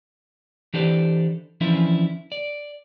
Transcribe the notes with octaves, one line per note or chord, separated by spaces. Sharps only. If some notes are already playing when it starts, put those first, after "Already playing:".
E3 D4 G4 A4 C5 D5
E3 F3 C#4 D4 E4
D5